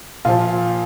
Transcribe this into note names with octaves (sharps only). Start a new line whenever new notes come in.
A#2 F3 F4